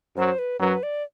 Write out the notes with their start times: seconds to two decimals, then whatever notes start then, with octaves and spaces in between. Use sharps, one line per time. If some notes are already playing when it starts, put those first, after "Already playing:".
0.16 F#2 F#3 C5
0.39 B4
0.60 F#2 F#3 B4
0.83 D5